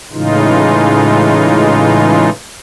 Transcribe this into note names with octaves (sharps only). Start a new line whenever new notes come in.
A2 C#3 E3 G#3 D#4 F4